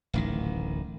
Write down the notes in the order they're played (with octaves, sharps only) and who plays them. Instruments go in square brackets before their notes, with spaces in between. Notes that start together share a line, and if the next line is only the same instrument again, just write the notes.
[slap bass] D1 A1 D#3